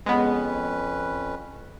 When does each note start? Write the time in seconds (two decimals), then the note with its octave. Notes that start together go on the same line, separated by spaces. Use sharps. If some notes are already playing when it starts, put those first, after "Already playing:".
0.06 F2 G#3 B3 C#4 B4